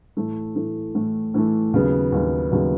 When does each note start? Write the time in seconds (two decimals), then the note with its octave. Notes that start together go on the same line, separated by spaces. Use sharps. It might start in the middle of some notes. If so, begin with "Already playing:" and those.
0.17 A2 E3 A3
0.55 A2 E3 A3
0.95 A2 E3 A3
1.34 A2 E3 A3
1.73 D#2 C#3 F#3 B3
2.12 D#2 C#3 F#3 B3
2.51 D#2 C#3 F#3 B3